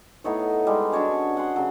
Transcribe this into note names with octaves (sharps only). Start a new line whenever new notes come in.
A2 B3 D#4 C#5
G3 G#3
D4 F#4 C#5 D6
C#4
F#5 C6
C#3 F#3